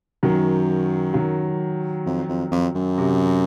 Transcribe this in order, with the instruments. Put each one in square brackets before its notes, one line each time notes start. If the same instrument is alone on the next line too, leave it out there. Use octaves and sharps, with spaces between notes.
[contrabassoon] F#2 [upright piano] D#3 F#3
[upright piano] D#3 F#3
[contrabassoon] F2
F2
F2
F#2
[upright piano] C3